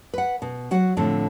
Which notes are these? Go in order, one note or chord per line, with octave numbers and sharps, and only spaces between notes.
B4 F#5
B2
F#3 F#4 F#5
A2 D3 F3 C4